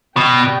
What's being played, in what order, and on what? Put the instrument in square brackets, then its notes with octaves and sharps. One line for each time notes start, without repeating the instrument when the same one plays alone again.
[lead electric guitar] B2 [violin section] G4 D5 G5